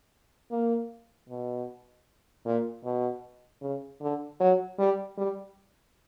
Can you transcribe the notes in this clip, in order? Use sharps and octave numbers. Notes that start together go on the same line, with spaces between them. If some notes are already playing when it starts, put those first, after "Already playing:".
A#3
B2
A#2
B2
C#3
D3
F#3
G3
G3